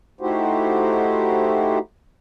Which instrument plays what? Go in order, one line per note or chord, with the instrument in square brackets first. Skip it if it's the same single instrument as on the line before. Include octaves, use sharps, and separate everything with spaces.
[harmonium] A3 D#4 E4 F#4 G4 C5